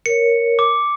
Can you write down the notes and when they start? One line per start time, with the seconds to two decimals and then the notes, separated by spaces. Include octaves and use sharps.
0.06 A#4 C#5 C#7
0.59 D6